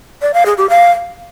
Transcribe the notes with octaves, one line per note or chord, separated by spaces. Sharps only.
D5
F5
G#4
G4
F5